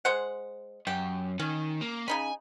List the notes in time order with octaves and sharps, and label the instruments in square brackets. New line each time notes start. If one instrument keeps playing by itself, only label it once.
[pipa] G#3 C5 F#5
[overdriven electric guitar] F#2 [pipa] G4
[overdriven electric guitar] D#3 [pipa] C#4
[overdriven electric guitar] A#3
[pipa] C#3 D#4 B5 [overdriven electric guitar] G#5